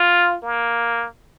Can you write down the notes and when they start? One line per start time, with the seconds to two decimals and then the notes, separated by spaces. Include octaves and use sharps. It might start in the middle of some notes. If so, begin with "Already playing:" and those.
Already playing: F4
0.43 A#3